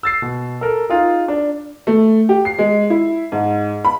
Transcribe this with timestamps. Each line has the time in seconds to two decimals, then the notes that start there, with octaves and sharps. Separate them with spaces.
0.03 E6 A6 C7
0.22 B2
0.61 A4 A#4
0.90 D#4 F4 G#4
1.28 D4
1.87 A3
2.29 G4
2.45 C7
2.59 G#3
2.90 E4
3.32 G#2
3.85 B5